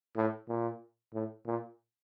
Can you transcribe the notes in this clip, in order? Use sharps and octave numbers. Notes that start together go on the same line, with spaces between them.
A2
A#2
A2
A#2